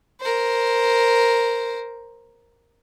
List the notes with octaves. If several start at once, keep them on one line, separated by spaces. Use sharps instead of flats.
A#4 C5